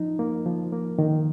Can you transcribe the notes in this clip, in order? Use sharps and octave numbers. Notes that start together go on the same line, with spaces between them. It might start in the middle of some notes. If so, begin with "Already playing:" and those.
Already playing: F3 D#4
A#3
F3
A#3
D#3